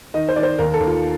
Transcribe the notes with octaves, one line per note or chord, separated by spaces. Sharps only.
D#3 D#5
C5
D#3 D5
C5
D#2 A#4
A4
D#2
F4